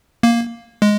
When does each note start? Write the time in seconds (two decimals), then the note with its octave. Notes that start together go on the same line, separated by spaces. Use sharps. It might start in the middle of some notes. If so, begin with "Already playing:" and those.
0.23 A#3
0.82 G#3